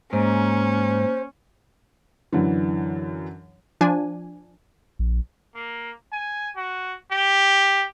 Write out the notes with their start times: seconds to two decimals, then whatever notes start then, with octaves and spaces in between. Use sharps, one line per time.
0.13 G#2 A#3 C#4 C5
2.33 F#2 D3 E3
3.81 F3 D4 G#5
4.99 A#1
5.55 A#3
6.12 G#5
6.56 F#4
7.12 G4